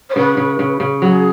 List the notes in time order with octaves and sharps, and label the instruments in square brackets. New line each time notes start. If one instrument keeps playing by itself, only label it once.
[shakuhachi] C#5
[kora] C#3 [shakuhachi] B4
[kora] C#3
C#3
C#3
[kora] F#3 [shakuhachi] G#4